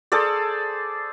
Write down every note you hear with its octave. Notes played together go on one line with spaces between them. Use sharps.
G#4 A4 C5 D5